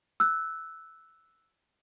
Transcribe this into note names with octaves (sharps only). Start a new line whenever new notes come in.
E6 F#6